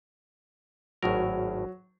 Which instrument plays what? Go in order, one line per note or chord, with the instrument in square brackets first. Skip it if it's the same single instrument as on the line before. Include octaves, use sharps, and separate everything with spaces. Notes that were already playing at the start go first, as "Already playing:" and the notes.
[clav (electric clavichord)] G#1 A2 A#4 [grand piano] F#3